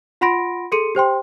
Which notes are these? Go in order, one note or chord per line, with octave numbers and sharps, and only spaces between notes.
F4 F#5 B5 C6 A#6 D7
G#4 A4 C6 C#7 D#7
G4 C5 G5 C6